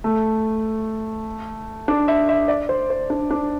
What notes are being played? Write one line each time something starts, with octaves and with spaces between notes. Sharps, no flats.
A3
D4
E5
E5
D5
C5
C5
D4
D4